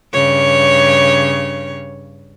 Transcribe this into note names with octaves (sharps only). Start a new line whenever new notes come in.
G2 C#3 C#5